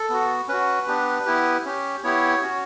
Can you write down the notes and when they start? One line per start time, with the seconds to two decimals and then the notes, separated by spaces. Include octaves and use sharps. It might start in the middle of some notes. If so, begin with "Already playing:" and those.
Already playing: A4
0.10 B3 F#4
0.48 C#4 F#4 B4
0.87 B3 D4 G4
1.26 B3 E4 G4
1.65 C#4 G4
2.03 B3 E4 G4 C#5
2.42 C#4 F#4